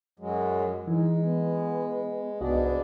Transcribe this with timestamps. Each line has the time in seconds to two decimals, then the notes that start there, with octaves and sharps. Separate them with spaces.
0.20 F#2 F#3 G#3
0.87 E3 G#3 D#4
1.21 B3
2.41 C2 G#2 B3 D4 F#4 D#5